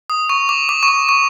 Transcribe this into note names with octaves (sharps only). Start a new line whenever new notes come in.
D#6
C#6
D6
D6
C#6
D6
C#6